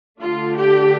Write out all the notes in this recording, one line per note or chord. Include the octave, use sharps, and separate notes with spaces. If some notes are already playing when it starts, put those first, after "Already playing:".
D3 A3 D4 F4
G4